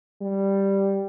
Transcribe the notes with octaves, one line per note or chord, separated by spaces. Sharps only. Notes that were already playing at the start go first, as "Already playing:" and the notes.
G3